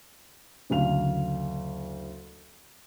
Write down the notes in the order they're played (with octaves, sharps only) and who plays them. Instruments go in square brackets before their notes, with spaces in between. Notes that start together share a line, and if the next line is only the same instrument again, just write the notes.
[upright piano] F#1 D2 F5 F7